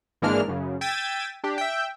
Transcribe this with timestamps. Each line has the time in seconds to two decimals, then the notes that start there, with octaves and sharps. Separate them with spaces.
0.22 G#1 E3 G#3 A#3 D4 F6
0.48 F#2 C#3
0.81 G5 E6 G#6 A6 B6 D#7
1.44 D4 G4
1.58 E5 G5